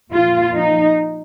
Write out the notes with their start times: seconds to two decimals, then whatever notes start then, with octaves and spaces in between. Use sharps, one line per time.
0.12 A#2 F3 F4
0.54 D#4